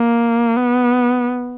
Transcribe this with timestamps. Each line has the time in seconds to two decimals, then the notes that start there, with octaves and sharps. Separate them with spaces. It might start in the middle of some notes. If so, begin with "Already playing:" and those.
Already playing: A#3
0.57 B3